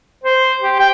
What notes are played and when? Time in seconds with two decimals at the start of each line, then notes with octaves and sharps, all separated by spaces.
0.24 C5
0.61 G4
0.79 G5